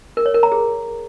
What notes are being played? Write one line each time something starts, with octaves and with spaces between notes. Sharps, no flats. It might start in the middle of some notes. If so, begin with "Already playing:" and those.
A#4
C#5
A#4
A#5
G#4